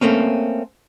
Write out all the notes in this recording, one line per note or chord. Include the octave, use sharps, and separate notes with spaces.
A3 A#3 C4 C#4